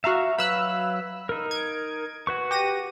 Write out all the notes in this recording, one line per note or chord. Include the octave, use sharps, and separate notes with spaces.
F#4 E5 F5 A#5 C#6
F#3 B4 F5 B5 E6 F#6
D#4 A#4
G#6 D7
F#4 B4 C#6
G4 A#6 D#7